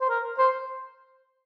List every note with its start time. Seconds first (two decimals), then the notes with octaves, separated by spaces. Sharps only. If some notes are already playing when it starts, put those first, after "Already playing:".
0.01 C5
0.09 A#4
0.38 C5